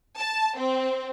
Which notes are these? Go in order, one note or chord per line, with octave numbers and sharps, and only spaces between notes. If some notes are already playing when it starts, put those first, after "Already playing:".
A5
C4